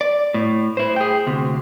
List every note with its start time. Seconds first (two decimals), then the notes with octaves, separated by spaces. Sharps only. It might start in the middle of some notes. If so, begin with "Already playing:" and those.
0.01 D5
0.34 A2
0.77 E4 C5
0.96 G#4 G5
1.27 D2 C3